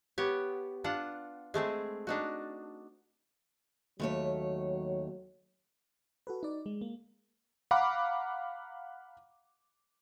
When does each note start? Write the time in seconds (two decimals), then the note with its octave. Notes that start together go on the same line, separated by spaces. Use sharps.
0.18 B3 G4 C#5
0.84 D4 F4 F#5
1.54 G#3 A3 C4 G#4
2.07 D4 D#4 F#4
4.00 D#2 F#3 A3 C#5
6.27 F#4 A4 B4
6.43 D#4 D5
6.66 G#3
6.81 A#3
7.71 F5 F#5 A#5 B5 D6